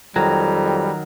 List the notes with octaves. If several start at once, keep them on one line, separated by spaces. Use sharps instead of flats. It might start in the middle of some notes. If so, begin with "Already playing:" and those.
F2 D#3 F#3 G3 A#5